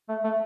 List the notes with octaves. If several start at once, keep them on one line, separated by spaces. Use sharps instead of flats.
A3
A3